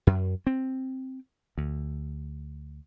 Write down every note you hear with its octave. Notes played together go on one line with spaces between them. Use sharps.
F#2
C4
D2